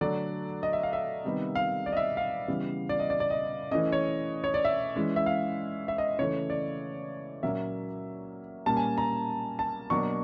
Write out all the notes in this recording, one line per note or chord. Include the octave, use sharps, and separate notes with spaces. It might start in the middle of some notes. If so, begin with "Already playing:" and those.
D3 F#3 A3 D4 D5
D#5
E5
F5
E5
C3 D#3 G3 B3 D#4
F5
D5
D#5
E5
F5
C#3 E3 G3 B3
D5
D#5
D5
D5
D#5
E3 A3 C#4 D#5
C#5
C#5
D5
E5
E3 G#3 C#4
E5
F5
E5
D#5
C#3 E3 A3 C#5
D5
A#2 F#3 A#3 C#4 E5
A#2 G3 A#3 C#4 A5
G#5
A#5
A5
B2 F#3 A#3 D4 C#6